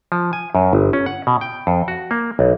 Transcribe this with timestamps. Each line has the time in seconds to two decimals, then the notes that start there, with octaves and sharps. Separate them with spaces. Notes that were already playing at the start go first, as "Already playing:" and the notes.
0.12 F3
0.33 G#5
0.55 F#2
0.73 G1
0.93 C#4
1.06 F#5
1.27 B2
1.41 G5
1.67 F2
1.88 F#4
2.11 A#3
2.39 B1